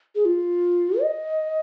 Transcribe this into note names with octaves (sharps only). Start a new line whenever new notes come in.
G#4
F4
D#5